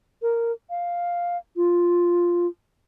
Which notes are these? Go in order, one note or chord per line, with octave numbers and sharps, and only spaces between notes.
A#4
F5
F4